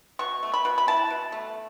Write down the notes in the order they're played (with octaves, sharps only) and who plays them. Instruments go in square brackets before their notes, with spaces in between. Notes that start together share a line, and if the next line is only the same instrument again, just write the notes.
[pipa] B2 C#6
A3
B5
B2
B5
E4 A5
B2
A3